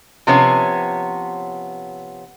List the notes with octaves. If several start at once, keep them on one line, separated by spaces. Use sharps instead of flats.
C3 F3 B3 C#4 C#5